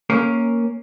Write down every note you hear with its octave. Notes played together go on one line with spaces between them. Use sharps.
A#3 C#4 A#4